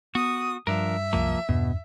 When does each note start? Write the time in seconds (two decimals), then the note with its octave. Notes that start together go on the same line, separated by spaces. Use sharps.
0.15 B3 F#4 D#6
0.67 G2 F3 D4 A#4 E5
1.13 C2 F#2 F3 A#3
1.49 E2 G2 B2